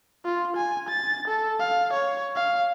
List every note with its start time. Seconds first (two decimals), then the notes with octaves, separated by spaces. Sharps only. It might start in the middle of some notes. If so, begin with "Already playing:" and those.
0.25 F4
0.57 G#5
0.89 A6
1.28 A4
1.60 F5
1.94 C#5
2.36 F5